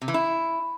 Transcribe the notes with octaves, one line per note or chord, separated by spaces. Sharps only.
C3
E3
E4